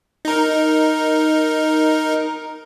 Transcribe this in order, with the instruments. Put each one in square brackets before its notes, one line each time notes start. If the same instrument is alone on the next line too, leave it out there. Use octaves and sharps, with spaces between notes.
[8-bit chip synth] D#4 A#4